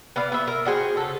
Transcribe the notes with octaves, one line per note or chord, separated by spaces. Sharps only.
B3 D5 F5
B3 E5
A#4
D4 F#4 G#4 C5
C#3 A4